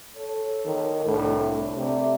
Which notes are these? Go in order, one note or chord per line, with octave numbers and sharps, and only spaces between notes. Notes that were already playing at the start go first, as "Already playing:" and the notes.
A4 C#5
D#3
C2 A2 D4
C3 A3 D5 E5